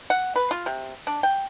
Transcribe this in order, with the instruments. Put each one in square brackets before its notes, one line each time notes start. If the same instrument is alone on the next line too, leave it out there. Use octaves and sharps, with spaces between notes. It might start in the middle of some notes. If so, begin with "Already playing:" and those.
[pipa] F#5
B4
F4
C3
D4
G5